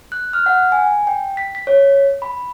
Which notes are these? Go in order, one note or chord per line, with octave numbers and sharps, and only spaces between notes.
F#6
F6
F#5
G#5
G5
B6
B6
C#5
B5